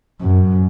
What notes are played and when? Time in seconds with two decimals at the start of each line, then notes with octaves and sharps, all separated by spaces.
0.21 F#2